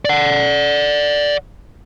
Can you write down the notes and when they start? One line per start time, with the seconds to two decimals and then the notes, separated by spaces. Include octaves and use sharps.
0.05 D5 F#5